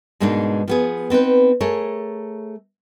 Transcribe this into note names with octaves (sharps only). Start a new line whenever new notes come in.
G#2 B2 G#3 A#3 D4 D#4
F3 B3 G#4
B3 C4 D#4 B4
A3 G#4 A#4 C#5